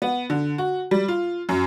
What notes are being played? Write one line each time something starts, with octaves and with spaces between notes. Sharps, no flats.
B3
D3
F#4
G3
F4
F#2